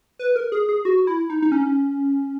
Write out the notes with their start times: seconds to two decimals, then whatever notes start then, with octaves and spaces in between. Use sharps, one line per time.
0.19 B4
0.36 A#4
0.52 G#4
0.69 G#4
0.85 F#4
1.07 E4
1.30 D#4
1.42 D#4
1.52 C#4